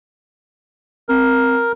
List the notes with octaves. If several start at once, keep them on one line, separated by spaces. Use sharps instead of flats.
C4 A#4